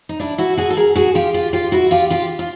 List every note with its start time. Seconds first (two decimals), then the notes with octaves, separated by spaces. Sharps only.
0.09 D#4
0.20 D4 E4
0.38 E4 F#4
0.57 F#4 G#4
0.70 A4
0.77 G#4 A#4
0.95 F#4 G#4
1.15 F4 G4
1.34 F4 G4
1.53 F4 G4
1.72 E4 F#4
1.91 F4 G4
2.10 F4 G4
2.39 F4